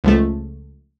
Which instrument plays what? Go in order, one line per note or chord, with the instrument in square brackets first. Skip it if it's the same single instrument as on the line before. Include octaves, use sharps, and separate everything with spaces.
[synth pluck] C#2 F3 A3